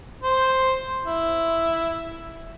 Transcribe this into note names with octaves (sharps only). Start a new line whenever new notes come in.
C5
E4